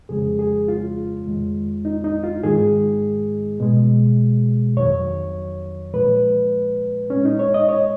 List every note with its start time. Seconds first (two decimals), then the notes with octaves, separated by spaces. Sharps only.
0.09 F2 C#3 F3 G#3 G#4
0.39 G#4
0.68 F4
1.26 F2 D#3 G#3
1.85 D#4
2.04 D#4
2.24 F4
2.43 G#2 D#3 G#3 G#4
3.60 B2 G#3
4.77 F2 D#3 F#3 C#5
5.93 A#2 F3 G#3 B4
7.10 A#2 G#3 C#4
7.25 D#4
7.39 C#5
7.54 D#5
7.69 C#5